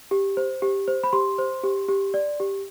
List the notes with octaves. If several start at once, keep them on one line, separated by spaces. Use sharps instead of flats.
G4
C5
G4
C5
B5
G4 C6
C5
G4
G4
D5
G4